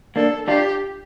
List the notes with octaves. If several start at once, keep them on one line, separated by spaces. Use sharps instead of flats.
A#3 D4 A4
D4 F4 G4